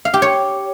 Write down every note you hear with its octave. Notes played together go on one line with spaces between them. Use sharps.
F5
G4
C#5